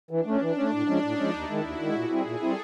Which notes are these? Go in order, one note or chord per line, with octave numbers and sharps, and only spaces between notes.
E3 D4
A3 C#4
E3
A3 C#4
A2 D4
F3 G#3 C#4
A2 D#4
F3 G#3 C#4
D#2 E4
D#3 G#3
D#2 F#4
D#3 G#3
A#2 G#4
G3 C4 E4
A#2 A4
G3 C4 E4